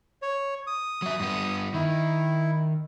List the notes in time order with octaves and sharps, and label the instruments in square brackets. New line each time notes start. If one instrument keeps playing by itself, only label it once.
[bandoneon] C#5
D#6
[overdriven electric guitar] F#3 E5
G2 B3
[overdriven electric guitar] D#3 [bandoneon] E4